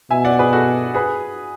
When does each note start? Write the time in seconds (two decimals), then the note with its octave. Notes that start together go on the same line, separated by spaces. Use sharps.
0.10 B2 E5 G#5
0.25 D5 F#5
0.39 G#4 B4
0.53 F#4 A4
0.95 G#4 B4